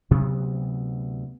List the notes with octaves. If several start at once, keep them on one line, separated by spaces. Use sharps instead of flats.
D2 C3 F#3 B3